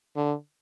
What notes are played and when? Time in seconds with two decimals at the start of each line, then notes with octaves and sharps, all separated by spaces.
0.16 D3